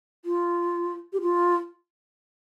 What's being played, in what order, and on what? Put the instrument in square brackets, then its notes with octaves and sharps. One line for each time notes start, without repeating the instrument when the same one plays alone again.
[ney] F4
G4
F4